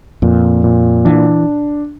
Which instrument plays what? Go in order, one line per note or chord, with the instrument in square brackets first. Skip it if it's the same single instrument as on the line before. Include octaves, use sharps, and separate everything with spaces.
[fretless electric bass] F2 [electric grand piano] A#2
[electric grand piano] A#2
[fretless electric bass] E3 [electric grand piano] D4